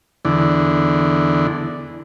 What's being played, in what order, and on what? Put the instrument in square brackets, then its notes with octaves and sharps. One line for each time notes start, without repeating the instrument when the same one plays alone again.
[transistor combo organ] E2 D3